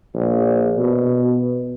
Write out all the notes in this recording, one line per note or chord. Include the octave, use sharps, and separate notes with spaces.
A#1
B2